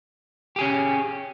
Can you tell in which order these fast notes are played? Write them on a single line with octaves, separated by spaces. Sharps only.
G4 G#4 C#4